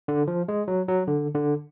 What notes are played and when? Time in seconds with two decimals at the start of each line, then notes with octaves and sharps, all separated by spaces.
0.08 D3
0.28 F3
0.48 G#3
0.68 F#3
0.88 F#3
1.08 D3
1.35 D3